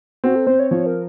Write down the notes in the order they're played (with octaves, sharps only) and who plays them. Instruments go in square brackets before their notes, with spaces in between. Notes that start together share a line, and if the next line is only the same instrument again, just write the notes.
[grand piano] C4 [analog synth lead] F#4
[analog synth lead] A4
[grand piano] C4 [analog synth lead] C5
[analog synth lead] C#5
[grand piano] F3 [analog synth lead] C#5
[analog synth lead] A#4